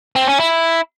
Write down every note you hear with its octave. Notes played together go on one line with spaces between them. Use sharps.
C4
C#4
E4